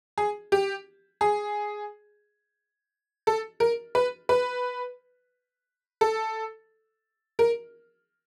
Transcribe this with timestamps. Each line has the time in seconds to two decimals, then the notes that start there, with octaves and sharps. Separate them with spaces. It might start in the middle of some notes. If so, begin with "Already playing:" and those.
0.18 G#4
0.52 G4
1.21 G#4
3.27 A4
3.60 A#4
3.95 B4
4.29 B4
6.01 A4
7.39 A#4